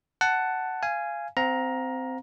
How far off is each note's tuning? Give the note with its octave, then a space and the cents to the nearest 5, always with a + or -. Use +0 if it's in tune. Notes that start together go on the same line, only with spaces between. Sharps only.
F#5 +10 A5 +0
F5 -20 G#5 +0
C4 -15 F5 +30 A#5 +10